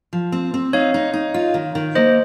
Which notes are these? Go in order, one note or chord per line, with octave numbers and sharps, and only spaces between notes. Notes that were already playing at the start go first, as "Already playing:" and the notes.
F3
C4
C4
D#4 C#5 F5
D#4
D#4
F4
D#3
D#3
A#3 C5 D#5